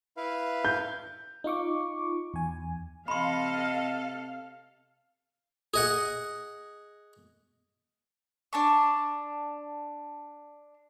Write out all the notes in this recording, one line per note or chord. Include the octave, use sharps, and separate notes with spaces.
E4 B4 F5
G6
D#4 F4 C#6 D6
E2 G#5
C3 A4 D#5 F5 B5 C6
G#4 D#5 F#5
D4 A5 C#6